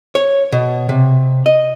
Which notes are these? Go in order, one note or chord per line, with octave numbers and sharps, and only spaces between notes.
C#5
B2
C3
D#5